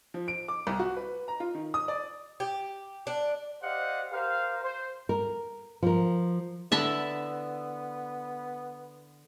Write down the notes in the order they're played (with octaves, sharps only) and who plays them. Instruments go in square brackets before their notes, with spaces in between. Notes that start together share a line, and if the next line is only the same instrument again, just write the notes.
[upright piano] F3
D7
D6
C2
F#4
B4
A#5
F4
D#3
D#6
D5
[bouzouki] G4
D4
[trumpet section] G4 C5 D5 D#5 F5 F#5
G4 A#4 C5 F5
C5
[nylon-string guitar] A#4
F3 A#4
[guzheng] D3 E4 [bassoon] B3 [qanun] E5 A5 B5